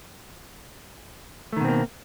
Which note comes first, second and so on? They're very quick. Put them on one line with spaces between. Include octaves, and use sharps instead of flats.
A3 D#3 B2 C4 A#3